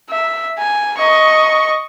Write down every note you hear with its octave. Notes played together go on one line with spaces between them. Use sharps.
E5
G#5
D#5 C#6